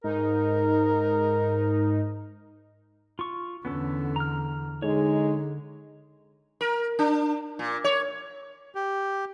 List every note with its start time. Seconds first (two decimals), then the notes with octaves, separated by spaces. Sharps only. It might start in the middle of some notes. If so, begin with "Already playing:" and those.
0.04 G#2 D#4 A#4
3.19 F4 C#6
3.65 E2 D3 B3 C#4 A4
4.16 A#5 F6
4.82 D3 G#3 D#4 C#5
6.61 A#4
6.99 D4
7.59 A#2
7.84 C#5
8.75 G4